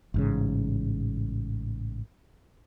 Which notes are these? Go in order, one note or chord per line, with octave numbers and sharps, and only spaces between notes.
A1 G#2 C#3